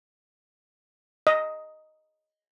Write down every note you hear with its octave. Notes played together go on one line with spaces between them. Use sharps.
D#5